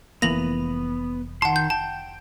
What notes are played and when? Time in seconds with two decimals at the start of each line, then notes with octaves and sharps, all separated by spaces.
0.22 F1 E3 A#3 B3 A#6 F7 F#7
1.42 D#3 F#5 A5 C6
1.56 G6
1.70 G5 A5